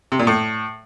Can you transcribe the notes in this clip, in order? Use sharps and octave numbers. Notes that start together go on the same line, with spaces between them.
C3
A#2
A2